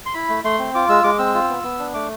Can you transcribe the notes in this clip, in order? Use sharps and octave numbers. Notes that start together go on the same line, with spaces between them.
C6
E4 B5
A3
A3 C6
C4
F4 D6
G#3 E6
G#3 D6
C4 E6
F4
B3
B3
D4
A3 D6